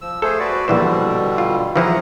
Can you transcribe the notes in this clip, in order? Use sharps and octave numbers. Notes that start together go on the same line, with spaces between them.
F3 E6
A3 G#4 A4 C5
F#4 B4 D5
A#1 B2 D3 E3 G3 C5
F4
E3 F3 E4 G#4 F#5 A#5